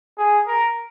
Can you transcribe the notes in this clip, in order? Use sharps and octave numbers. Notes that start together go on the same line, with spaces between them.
G#4
A#4